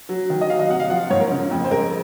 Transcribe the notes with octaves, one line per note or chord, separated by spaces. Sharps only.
F#3
D#3
D#5
F#3 F5
D#5
C3 F#5
F5
F3 F#5
F5
G#2 C#5
A#4
C#3
F2
C5
G#3 A#4